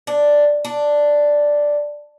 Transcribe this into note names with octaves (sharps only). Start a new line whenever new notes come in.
D4
D4